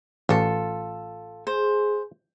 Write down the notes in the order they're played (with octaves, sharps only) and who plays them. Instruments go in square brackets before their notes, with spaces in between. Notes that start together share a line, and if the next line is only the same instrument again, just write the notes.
[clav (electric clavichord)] A1 [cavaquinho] F4 A4
[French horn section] G#4 [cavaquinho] C5